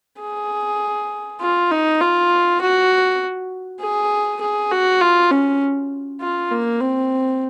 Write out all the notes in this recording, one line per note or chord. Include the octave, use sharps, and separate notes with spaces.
G#4
F4
D#4
F4
F#4
G#4
G#4
F#4
F4
C#4
F4
A#3
C4